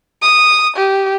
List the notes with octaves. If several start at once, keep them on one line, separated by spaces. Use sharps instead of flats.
D#6
G4